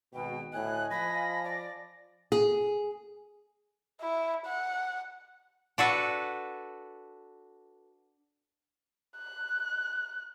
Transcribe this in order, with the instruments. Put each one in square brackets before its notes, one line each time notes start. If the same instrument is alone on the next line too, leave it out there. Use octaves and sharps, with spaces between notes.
[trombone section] G#1 [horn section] B2 [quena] G5
[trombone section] D2 A2 [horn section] D#5 G#5 [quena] F#6
[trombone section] F3 [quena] B5 [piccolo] A#6
[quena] D5
[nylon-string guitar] G#4
[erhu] E4
F#5
[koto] D4 F#4 A4 B4
[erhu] F#6